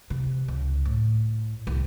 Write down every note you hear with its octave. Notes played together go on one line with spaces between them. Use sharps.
C3
C#2
A2
C2